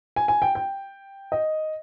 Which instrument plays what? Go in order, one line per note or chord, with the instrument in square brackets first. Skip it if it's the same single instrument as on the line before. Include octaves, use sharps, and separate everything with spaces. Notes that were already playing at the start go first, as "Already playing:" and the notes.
[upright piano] G#5
G#5
G5
G5
D#5